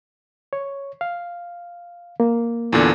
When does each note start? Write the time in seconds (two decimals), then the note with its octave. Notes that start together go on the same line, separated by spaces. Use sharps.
0.53 C#5
1.01 F5
2.20 A#3
2.73 E2 A#2 D3